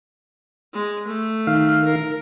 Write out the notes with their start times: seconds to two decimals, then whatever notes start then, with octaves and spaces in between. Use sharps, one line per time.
0.73 G#3
1.07 A3
1.47 D#3 F5
1.85 A#4